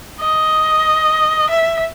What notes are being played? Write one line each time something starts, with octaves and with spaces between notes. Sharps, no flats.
D#5
E5